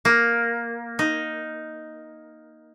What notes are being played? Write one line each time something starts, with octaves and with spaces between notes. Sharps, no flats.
A#3
D#4